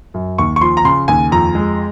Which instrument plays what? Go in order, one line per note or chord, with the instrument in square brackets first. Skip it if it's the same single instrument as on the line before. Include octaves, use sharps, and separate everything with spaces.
[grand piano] F#2
D#2 C#6
C#6
F3 C6
A#5
C#3 C6
D#2 G#5
F2 A#5
G#3